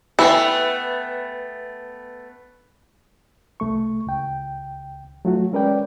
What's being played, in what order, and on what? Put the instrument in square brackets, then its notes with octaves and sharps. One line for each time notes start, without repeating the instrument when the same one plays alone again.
[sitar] A3 B3 [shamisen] E4 [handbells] G5 G#5 E6
[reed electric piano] C2 A3 C#6
C#2 G5
F#3 A3 F4 F#4
G#3 C#4 A#4 B4 D5 G5